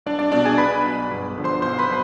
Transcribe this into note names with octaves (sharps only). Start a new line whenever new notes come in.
C2 D4 D5
D4 D5
B2 D4 D5
G#4 G#5
B1 B4 B5
B2
G1
G2 D3 F3
C5 C6
B1 C5 C6
B4 B5
B2